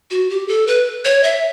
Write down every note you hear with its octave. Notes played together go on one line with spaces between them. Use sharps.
F#4
G4
A4
B4
C#5
E5